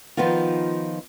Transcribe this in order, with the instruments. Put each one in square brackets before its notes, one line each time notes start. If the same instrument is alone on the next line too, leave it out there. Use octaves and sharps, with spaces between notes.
[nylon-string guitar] D#3 F3 B3 D#4 F4